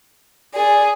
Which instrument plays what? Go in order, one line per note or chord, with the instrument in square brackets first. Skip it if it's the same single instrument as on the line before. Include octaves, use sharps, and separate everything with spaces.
[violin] G#4 [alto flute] D5